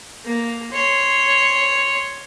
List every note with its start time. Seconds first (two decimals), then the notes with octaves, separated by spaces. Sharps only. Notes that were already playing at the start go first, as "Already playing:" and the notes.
0.25 A#3
0.72 C#5 C6